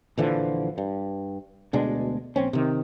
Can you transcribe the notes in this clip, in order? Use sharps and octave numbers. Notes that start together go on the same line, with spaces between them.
A#1 D3 E3 F3
G2
D2 B2 G#3 D4
A#1 C4 C#4
C3 D#3